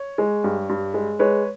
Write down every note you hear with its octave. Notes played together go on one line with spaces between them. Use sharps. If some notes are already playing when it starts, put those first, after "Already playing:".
Already playing: C#5
G#3
G2
G2
G#3
G#3 B4 C#5